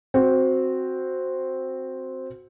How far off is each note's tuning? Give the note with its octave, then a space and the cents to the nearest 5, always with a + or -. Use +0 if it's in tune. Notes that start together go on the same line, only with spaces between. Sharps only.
C4 +0 F#4 +0